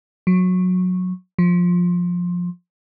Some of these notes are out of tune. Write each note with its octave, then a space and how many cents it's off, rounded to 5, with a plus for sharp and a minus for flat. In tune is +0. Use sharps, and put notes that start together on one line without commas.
F#3 -20
F3 +15